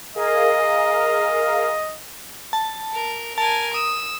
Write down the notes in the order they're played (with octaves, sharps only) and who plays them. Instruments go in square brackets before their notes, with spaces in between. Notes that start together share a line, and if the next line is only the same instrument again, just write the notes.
[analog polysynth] G#4 A#4 F5 [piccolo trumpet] D#5
[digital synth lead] A5
[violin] A#4
[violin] A#4 G#5 [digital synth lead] A5
[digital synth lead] D#6 [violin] E6